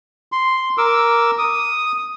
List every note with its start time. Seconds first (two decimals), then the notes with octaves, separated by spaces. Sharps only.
0.32 C6
0.78 A#4 D6 E6
1.38 D#6